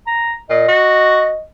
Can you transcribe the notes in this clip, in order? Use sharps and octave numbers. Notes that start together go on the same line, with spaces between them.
A#5
A#2 D#5
F#4